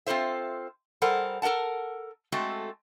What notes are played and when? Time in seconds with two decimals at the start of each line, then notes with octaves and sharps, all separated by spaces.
0.06 C4 F4 A4 C5 E5
1.02 G3 A4 A#4 C5 F#5
1.42 A4 A#4 D#5 F#5 A5
2.32 G#3 A3 C4 F#4 A4